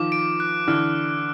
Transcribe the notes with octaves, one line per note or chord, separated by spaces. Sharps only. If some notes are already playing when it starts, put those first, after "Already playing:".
Already playing: D#3 F3 D6
D7
F#6
D3 E3 F6